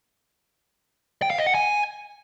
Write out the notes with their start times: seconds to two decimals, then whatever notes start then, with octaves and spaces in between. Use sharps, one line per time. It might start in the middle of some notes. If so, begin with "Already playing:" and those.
1.22 G5
1.30 F5
1.38 D#5
1.46 F#5
1.55 G#5